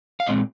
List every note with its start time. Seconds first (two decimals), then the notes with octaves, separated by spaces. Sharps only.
0.20 F5
0.27 A#2 G#3 C4 D#5